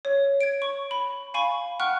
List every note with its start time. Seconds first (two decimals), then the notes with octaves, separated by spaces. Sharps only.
0.05 C#5
0.41 G#6 D7
0.62 C#6
0.91 B5
1.34 F5 G#5 B5 C#6
1.80 F#5 G5 C#6 F6 F#6